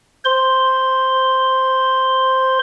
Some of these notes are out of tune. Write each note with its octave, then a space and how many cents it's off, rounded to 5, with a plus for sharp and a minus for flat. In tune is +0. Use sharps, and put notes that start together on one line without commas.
C5 +0 C6 +0